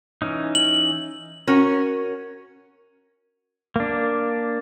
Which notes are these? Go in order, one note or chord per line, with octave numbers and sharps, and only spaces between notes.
E3 C#4 D#4
F#7
C#4 F#4 A#4
A#3 D4